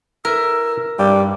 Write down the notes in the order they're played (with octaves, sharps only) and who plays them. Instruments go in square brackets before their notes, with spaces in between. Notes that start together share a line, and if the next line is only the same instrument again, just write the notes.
[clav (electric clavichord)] E4 B4 E5 [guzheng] A#4 [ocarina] E6
[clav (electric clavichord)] G2 [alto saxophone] G3 [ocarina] D6